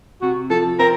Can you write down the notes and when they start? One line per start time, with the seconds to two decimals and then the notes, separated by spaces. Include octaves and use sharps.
0.22 C3 F#4
0.50 F3 A4
0.79 C4 A#4